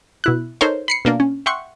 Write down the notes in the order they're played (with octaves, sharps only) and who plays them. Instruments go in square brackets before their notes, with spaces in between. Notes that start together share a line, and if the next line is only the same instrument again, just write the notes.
[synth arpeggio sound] B2 E4 F#6
D#4 A4 A#4 C5 C#5
B5 C7 C#7
B2 A#3 D4 A#4
C#4
E5 F#5 G5 C6 C#6